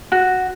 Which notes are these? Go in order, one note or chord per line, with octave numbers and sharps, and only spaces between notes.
F#4